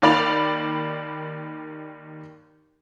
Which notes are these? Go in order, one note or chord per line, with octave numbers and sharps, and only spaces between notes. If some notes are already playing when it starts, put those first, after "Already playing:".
D#2 D#3 D5 B5 A6 F7